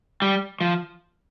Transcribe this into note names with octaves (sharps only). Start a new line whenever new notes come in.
G3
F3